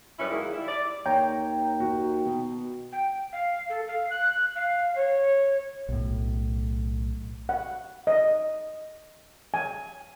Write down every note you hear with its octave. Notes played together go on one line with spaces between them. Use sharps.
F#2 G3 C#4 E4 B4 E5
D#3 G#3 A#3 E4
G3 E4
D5
D#2 C#5 G5 A#5
F#4
B2
G5
F5
A4
F5
F#6
F5
C#5
B1 A2
F#5
D#5
G#5